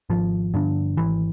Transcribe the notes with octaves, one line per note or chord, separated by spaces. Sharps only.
G#1 F3
G2 D3
G#1 E3